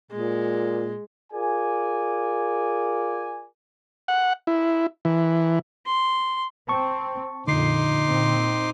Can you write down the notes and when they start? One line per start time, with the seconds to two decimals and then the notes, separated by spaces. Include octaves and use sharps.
0.11 A#2 G#3
1.32 F4 G#4 A#4 D5 G#5
4.08 F#5
4.47 E4
5.05 E3
5.86 C6
6.69 C4 A5 C#6
7.48 F2 A#2 D3 D#4 C6 D6 C7
8.05 A#2 C4